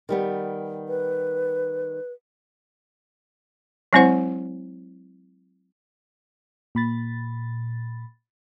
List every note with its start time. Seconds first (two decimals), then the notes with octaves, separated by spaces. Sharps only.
0.09 D#3 G3 B3
0.88 B4
3.93 F#3 G#3 C4 E4 C5 F#5
6.75 A#2 B5 A6